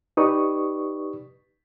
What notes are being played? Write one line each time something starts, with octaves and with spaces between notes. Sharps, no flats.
D#4 G4 B4 D5 C#6 D#6